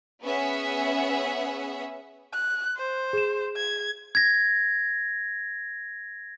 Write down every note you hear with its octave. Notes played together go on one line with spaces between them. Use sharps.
B3 C#4 G#4 E5 F#5
F#6
C5
G#4 E7
G#6
G#6 A#6